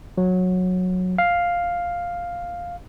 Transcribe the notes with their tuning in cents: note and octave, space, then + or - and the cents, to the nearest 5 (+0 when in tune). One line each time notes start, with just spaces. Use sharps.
F#3 -15
F5 +5